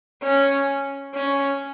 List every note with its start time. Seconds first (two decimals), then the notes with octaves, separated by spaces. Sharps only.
0.23 C#4
1.14 C#4